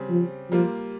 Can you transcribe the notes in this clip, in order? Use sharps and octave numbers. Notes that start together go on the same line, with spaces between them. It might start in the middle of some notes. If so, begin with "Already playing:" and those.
Already playing: C#3 G3 C4
F3
F3 G3 A#3 F4